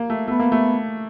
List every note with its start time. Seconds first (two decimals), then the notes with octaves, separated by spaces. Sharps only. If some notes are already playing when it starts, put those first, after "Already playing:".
Already playing: A#3
0.10 A3
0.27 A3 B3
0.40 A#3
0.52 A3